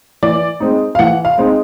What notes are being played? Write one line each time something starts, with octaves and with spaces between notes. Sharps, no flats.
E3 D5
G#3 C4 D#4
F5
E3 F#5
F5
G#3 C4 D#4